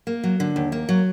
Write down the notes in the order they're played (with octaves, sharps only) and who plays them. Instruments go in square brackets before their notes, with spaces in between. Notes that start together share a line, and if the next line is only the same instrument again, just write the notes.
[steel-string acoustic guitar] A#3
F#3
D3
D#2
A#3
F#3